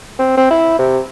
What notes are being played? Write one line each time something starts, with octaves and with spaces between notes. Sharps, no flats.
C4
C4
E4
C3